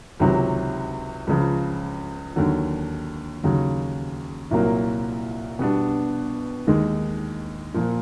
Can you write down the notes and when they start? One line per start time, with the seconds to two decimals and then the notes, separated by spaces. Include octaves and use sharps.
0.20 C#2 C3 D#3 F#3
1.27 C#2 C#3 F3
2.36 D#2 D3 F#3
3.44 D#2 C#3 F#3
4.51 C2 A#2 F#3 A#3
5.59 B2 G3 B3 D4
6.67 D#2 D#3 G#3
7.74 A#2 F3 A#3